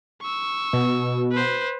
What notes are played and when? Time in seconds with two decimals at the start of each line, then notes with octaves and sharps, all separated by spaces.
0.22 C#6 E6
0.73 B2
1.32 B4 C5